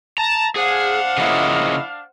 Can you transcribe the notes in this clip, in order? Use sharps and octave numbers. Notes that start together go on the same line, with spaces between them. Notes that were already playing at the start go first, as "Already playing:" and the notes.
A5 A#5
D4 G#4 C5 F5 F#5
C#3 F3 A#3 E4 D#5